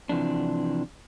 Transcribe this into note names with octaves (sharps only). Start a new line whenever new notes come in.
C3 E3 F3 D4